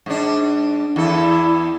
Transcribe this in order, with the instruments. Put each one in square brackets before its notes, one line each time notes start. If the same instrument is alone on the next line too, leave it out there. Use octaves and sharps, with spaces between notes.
[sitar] G#2 D4
[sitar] E2 A4 [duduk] E4